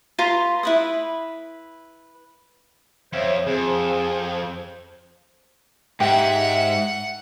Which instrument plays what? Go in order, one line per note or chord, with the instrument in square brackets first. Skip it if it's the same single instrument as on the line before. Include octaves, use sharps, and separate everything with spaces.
[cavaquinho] F4 B4 A#5 C6
E4 B4 D#6
[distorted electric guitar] F2 [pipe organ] C5 C#5 E5
[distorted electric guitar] F2 [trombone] G#4 [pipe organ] C5
[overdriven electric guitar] G#2 [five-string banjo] G4 [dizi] E5 [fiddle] F#5